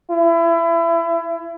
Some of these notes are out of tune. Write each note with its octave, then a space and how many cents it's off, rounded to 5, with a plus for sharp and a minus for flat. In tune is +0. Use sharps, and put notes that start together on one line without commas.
E4 +25